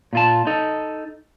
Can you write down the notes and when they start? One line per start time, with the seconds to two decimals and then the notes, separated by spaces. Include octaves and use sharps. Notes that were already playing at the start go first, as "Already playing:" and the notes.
0.13 A#2 F4 A5
0.47 D#4 A4